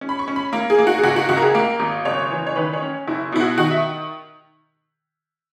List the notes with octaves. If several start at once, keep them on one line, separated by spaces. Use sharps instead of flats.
C#4
B5
C#6
C#4
B5
A#3
G#4
A#3
F#4
G#4
C#2 F#4
F#4
C#2 F#4
A#4
G#4
A#3 A#4
G#1
F#1 C#5
E3
C#5
D#3 B4
C#5
C#4
F#1 E4
B2 E4
F#4
D#3 F#4
E5